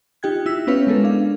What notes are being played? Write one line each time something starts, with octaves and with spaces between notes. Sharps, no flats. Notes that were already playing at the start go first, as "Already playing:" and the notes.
D#4 F4 G4 G5 F#6 G#6
E4 E6 B6
B3 C#4 E4 B4 C#5 F5
G#3 B3 A4 A#4
D4 F5